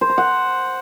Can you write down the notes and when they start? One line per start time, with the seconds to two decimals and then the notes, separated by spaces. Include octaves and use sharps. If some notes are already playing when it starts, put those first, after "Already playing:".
0.01 C5
0.09 A#5
0.18 F#5